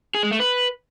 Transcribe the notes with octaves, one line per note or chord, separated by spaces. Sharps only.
G#4
G#3
A3
B4